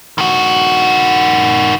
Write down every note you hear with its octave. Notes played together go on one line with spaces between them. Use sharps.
D#3 F#4